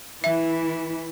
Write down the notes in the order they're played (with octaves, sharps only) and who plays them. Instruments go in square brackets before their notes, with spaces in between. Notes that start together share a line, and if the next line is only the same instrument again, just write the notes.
[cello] E3 E4 [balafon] E5